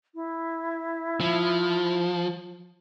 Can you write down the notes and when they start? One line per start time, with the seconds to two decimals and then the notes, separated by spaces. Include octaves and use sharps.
0.15 E4
1.21 F3